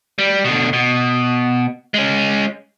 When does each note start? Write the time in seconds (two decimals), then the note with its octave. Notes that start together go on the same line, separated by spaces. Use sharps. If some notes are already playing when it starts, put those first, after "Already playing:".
0.19 G3
0.45 B2 D3
0.73 B2
1.94 G#3 C#4